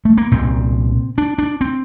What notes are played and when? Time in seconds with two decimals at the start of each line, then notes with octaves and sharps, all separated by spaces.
0.05 A3
0.17 A#3
0.32 C2 A#2 C4
1.18 D4
1.38 D4
1.61 C4